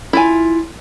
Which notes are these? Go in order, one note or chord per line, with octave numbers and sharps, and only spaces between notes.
E4 F4 G#5